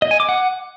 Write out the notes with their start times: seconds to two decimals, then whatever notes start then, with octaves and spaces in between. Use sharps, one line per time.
0.02 D#5
0.11 G#5
0.20 D6
0.29 F#5